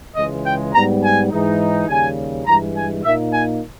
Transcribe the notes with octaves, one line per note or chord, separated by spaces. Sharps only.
C#2 C#3 E3 G#3 D#5
G5
G#2 G3 B3 A#5
G#5
G#2 E3 G#3 D#4
D#2 C#3 G3 G#5
G2 E3 G#3 A#5
G#5
A#2 A#3 D#4 E5
G#5